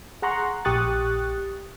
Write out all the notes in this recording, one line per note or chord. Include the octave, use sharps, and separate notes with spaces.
G#4 F#5 A#5 C6 C#6 F#6
A#1 G4 C#6 D#6 F#6 A6